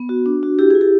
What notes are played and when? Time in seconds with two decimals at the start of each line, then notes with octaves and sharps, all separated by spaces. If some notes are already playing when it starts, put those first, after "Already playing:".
Already playing: B3
0.09 F#4
0.26 D4
0.43 F#4
0.59 E4 G4
0.70 E4 G#4
0.81 G4